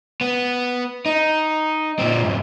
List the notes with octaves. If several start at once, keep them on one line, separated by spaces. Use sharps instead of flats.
B3
D#4
A#2 C4
F2 G#2